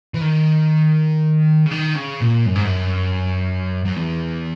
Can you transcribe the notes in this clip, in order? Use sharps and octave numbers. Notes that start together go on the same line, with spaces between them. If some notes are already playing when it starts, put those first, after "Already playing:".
E3
D#3
C#3
D#3
C#3
A#2
F#2
G#2
F#2
F#2
E2